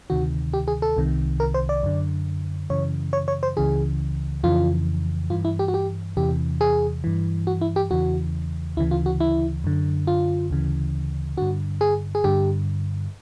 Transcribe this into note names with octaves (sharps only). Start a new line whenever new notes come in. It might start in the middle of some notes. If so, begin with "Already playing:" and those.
D2 C3 D#3 F#4
G4
G#4
A4
C2 C3 D#3
A#4
C5
D5
F#2 D3
F#2 C#3 E3 C#5
C#5
C#5
C5
C#2 C#3 E3 G#4
F2 C#3 E3 F4
G2 E3 F4
E4
G4
F#4
G4
E2 C3 E3 G4
G#4
G2 E3
F#4
E4
G4
E2 C#3 E3 F#4
D2 C#3 E3 E4
F4
F#4
E4
F#2 D3
F4
D2 C#3 E3
G2 D3 F#4
G#4
G#4
G2 D3 G4